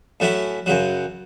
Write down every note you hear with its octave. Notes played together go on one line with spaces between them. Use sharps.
A2 F#3 C#4 E4
F#2 C#3 F#3